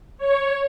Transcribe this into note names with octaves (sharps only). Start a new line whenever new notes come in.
C#5